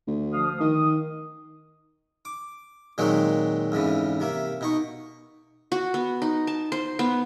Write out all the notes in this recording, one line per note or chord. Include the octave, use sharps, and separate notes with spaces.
D2
F3 F5 D#6
D#3 D#6
D6
A#2 D#3 F#3 G#3 C4 F#4
F2 G#2 C#3 E3
C3 A#3 E5
B2 D#4 C#6
F#4
B3
D#4
A5
C5
B3